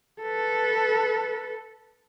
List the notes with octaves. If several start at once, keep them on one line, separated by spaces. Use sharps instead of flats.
A4 B4